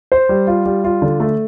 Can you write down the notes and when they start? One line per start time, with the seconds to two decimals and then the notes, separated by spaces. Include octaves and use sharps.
0.12 C5
0.29 G3
0.47 F4
0.66 G3
0.84 F4
1.02 D3
1.20 A3